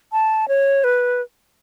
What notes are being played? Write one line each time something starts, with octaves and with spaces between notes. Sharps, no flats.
A5
C#5
B4